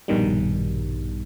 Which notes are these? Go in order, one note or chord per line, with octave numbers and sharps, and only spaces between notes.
A#1 G2 B2 D#3 G3